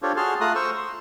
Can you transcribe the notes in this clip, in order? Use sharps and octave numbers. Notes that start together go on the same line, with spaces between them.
D4 F4 G4 A4 C5 C#5
F#4 G#4 A5 C6 F6
A3 F4 A#5 D#6 F#6
C5 C#6 E6
C6